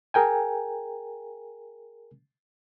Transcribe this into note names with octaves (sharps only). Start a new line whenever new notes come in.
G#4 A#4 G5 G#5